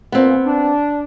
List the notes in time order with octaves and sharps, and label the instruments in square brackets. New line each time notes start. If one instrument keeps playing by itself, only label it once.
[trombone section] A#2 [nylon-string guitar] B3 C4
[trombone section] D4